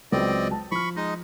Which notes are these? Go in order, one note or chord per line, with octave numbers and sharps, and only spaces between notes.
C#2 F#3 C4 B4 D5 D#5
A5
F3 B5 C#6 F6
G#3 D#4 D#5